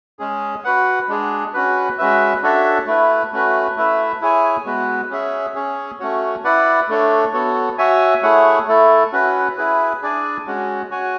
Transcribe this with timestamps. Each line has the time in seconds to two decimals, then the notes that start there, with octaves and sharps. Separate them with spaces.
0.19 G#3 C#4 G#4
0.64 F#4 B4 F#5
1.08 G#3 D4 G#4
1.53 C#4 F#4 B4
1.98 G#3 C#4 F#4 B4 E5
2.42 D4 F#4 A4 C#5 E5
2.87 A3 E4 B4
3.32 A3 C#4 F#4 B4
3.77 A3 E4 B4 E5
4.21 E4 G#4 C#5 G#5
4.65 G#3 B3 F#4 B4
5.10 C#4 G#4 C#5 E5
5.55 C#4 G#4 C#5
6.00 A3 C#4 F#4 C#5
6.44 E4 B4 D5 F#5
6.89 A3 D4 A4 C#5
7.33 B3 F#4 A4 C#5
7.78 F#4 C#5 E5 G#5
8.23 A3 E4 G#4 C#5 F#5
8.68 A3 E4 A4
9.12 C#4 F#4 B4
9.57 E4 G#4 B4
10.02 D4 G#4 D5 G#5
10.47 G#3 C#4 F#4
10.91 F#4 C#5 G#5